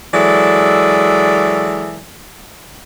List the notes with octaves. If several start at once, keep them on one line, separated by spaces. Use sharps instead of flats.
E3 F#3 G#3 A4 D5